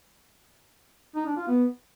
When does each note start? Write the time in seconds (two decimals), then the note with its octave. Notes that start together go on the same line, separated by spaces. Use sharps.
1.16 D#4
1.26 D4
1.37 F4
1.47 B3